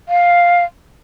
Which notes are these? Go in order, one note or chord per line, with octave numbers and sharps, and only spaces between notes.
F5